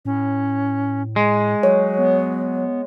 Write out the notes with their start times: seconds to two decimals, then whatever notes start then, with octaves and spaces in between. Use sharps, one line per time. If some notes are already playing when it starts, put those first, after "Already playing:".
0.05 A2 C#4
1.16 G#3
1.63 F#3 C#5
1.99 B3